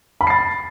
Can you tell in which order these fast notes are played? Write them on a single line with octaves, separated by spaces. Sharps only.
B5 A5 C7 A6